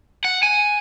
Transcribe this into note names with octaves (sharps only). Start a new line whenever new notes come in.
F#5
G#5